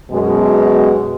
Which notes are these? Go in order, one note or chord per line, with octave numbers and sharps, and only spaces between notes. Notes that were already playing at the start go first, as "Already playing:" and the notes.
F#2 B2 G#3